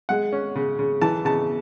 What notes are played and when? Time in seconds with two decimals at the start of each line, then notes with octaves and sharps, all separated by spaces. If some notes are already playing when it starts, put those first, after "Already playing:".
0.09 G#3 F#5
0.33 C#4
0.55 C#3
0.79 C#3
1.01 E3 A5
1.25 C#3 A5